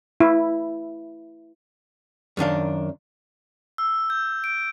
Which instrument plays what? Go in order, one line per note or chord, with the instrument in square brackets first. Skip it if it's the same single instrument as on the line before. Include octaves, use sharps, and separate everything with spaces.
[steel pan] E4
[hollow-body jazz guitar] F#2 D#3 D4 F5
[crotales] E6
G6
D7